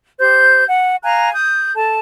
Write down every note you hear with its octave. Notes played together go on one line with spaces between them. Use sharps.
G4 C5 G6
F#5
F5 G#5 A#5 F#6
D#6 G6
A4 A5